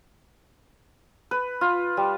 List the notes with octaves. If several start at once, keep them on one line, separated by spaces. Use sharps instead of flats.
B4
F4
G3